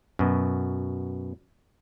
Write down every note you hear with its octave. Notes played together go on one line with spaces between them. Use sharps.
F#2 B2